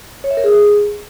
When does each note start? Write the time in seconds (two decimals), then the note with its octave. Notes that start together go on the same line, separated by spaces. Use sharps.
0.24 C#5
0.31 E5
0.37 A#4
0.44 G#4